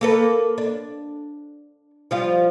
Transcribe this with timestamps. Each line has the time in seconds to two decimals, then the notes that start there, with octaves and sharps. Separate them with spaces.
0.01 A#3 A4 B4
0.58 D4
2.11 F3 G3 F4